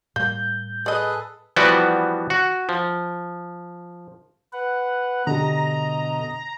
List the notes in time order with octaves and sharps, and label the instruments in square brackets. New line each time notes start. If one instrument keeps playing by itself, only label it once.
[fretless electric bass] A2 G3 [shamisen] A#3 [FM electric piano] G6
[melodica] G#4 A4 B4 [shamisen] D5 D#5
[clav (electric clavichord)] E3 F3 G3 B3 F#4 D5
F#4
F3
[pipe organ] B4 F#5
[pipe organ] B2 D#5 [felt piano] D3 G4 [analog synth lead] A#5